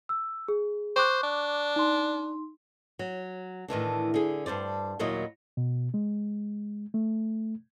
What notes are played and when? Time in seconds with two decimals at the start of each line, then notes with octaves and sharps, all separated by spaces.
0.09 E6
0.48 G#4
0.96 C5 C#6 D6 F#6
1.23 D4
1.76 D#4 C6
2.99 F#3
3.68 A2 D#3 E3 D4
4.14 D3 G#4
4.46 G2 B2 C5 D5
4.99 D#2 A#2 F#3 A#3 E4 D#5
5.57 B2
5.94 G#3
6.94 A3